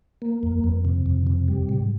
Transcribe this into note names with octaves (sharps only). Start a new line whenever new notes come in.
A#3
F2
F2
C3
F2
C3
G3
G#2